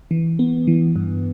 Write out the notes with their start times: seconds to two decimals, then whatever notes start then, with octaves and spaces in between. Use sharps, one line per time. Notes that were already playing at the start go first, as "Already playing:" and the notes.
0.11 E3
0.39 B3
0.67 E3
0.96 G2